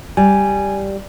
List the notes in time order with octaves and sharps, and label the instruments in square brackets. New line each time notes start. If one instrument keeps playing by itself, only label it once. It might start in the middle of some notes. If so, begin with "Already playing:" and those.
[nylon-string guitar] G3 [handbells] G#5